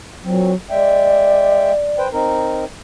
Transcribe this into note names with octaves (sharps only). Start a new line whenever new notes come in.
A#2 F#3 C4
G#3 D5 E5 G5
B4 C5 G5
C4 D#4 A#4